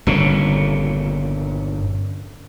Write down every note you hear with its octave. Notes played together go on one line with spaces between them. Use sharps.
G1 A#2 C#3